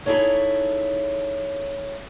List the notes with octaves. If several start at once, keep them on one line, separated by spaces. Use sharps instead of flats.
D#4 E4 G#4 A4 C#5